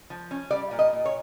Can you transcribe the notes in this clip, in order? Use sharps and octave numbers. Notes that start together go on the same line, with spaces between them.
F3
C#4
G3 D5
A#2
D#5
A#2
C#5